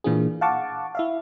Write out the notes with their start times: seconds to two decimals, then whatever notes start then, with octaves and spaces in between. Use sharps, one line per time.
0.04 A#2 E3 A#3 D4 F4 G#4
0.41 F5 F#5 A5 C#6 D6
0.95 E4 E5 F5